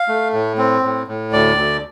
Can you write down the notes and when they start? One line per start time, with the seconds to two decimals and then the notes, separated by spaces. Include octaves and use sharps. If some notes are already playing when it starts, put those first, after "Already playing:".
Already playing: F5
0.08 A3
0.33 A2
0.58 C4
0.83 A2
1.08 A2
1.33 D2 D5
1.57 D2